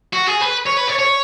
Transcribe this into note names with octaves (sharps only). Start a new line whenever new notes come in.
F#4
G#4
B4
C#5
B4
C#5
C#5